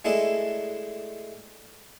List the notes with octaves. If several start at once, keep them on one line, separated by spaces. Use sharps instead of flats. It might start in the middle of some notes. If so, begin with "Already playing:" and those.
G#3 A3 D4 E4 A4 D#5